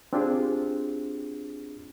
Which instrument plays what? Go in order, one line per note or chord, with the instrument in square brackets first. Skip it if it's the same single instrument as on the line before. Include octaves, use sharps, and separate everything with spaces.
[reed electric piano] C4 D4 F4 G4 G#4